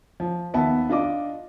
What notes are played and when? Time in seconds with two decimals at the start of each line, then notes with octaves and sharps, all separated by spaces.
0.20 F3
0.54 D#2 B3 E5 A5
0.89 D4 F4 D#5 D6